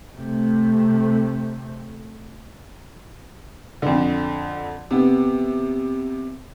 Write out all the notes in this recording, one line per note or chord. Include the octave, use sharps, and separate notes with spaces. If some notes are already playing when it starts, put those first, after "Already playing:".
C3 A3
F2 D3
C3 B3